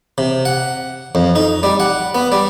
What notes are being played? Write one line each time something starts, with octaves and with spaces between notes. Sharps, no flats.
C3
F#5
F2
D#4
G3
F#5
B3
G3